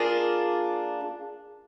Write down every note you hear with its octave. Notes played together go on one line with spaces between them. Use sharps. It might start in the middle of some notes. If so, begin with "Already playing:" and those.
Already playing: A#3 D4 F4 G#4